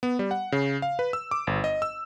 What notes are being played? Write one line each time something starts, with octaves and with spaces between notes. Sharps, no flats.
B3
G3
F#5
C#3
F5
B4
E6
D6
G1
D#5
E6